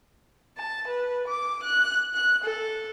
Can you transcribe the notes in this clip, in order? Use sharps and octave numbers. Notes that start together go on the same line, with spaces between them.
A5
B4
D6
F#6
F#6
A4